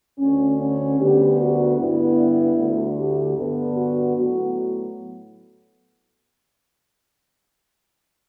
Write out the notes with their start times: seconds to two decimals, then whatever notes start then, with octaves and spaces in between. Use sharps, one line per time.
0.19 D2 D3 A3 C#4
0.59 C#4
0.98 D2 D3 G3 B3 G4
1.38 F#4
1.77 G2 D3 G3 B3 E4
2.56 D2 D3 A3
2.96 G4
3.35 G2 D3 G3 B3 A4
3.75 F#4
4.14 A2 F#3 B3 F#4